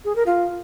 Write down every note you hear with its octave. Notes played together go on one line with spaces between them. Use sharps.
G#4
A#4
F4